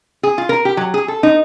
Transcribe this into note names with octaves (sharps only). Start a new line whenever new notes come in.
G#4
F4
A#4
G4
F#3
G#4
A4
D#4